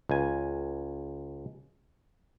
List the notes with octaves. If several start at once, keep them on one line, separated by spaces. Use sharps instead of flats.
C#2 G#5